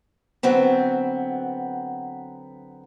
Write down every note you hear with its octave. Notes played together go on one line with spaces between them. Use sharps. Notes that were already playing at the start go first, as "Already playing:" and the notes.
D3 F#3 B3 C4